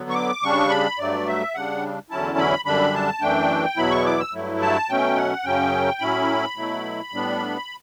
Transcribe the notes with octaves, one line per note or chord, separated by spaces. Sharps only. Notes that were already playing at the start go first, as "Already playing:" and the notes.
Already playing: D3 F#3 B3
C#6
D6
C#3 G3 D4 C#6
B5
G2 F#3 A3 D5
E5
C#3 G3 D4 F#5
E2 D3 F#3 C#4 E4 A5
B5
F#2 D3 G3 D4 B5
A5
F#2 E3 A3 D4 G5
E2 B2 F#3 B3 E4 B5
C#6
D6
E6
G2 F#3 A3 E4
A5
B2 F#3 A3 C#4 G5
F#5
F#2 C#3 F#3 C#4 G5
A2 F#3 C#4 E4 B5
B2 F#3 A3 E4
A2 G3 B3 D4